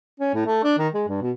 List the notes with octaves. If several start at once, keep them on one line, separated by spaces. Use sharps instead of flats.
C#4
A2
A3
D4
D#3
G#3
G2
B2